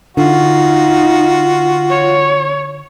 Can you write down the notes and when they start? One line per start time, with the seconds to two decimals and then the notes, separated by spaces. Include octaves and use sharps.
0.17 D3 D#4 F4 F#4
1.90 C#5